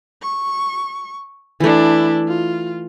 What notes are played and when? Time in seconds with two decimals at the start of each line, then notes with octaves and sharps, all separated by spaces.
0.22 C#6
1.60 E3 A3 D4 E4
2.28 F4